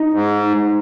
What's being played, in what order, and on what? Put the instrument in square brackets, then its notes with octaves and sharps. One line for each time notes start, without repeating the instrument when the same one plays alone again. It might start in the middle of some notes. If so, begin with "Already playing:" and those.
Already playing: [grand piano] D#4
[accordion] G#2